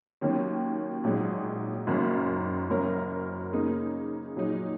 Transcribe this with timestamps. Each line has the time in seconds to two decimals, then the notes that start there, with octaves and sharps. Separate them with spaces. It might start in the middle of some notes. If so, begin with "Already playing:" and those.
0.21 D#2 D#3 F#3 C#4
1.04 A#1 G#2 F#3 D#4 G#4
1.87 F#1 F#2 D#3 A#3
2.70 F#1 F#2 F#3 C#4 A#4
3.53 C#3 A#3 D#4 G#4
4.36 A#2 F#3 D#4 G#4